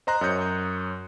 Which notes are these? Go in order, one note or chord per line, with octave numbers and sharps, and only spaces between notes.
C5 D#5 A#5 C6 F#6
F#2 C#5 D#6 G6 C#7